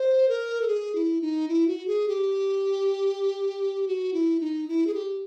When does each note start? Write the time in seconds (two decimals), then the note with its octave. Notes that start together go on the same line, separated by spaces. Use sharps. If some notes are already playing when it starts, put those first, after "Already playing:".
Already playing: C5
0.28 A#4
0.62 A4
0.68 G#4
0.95 E4
1.21 D#4
1.48 E4
1.67 F#4
1.87 G#4
2.08 G4
3.88 F#4
4.14 E4
4.40 D#4
4.68 E4
4.87 G#4
4.94 G4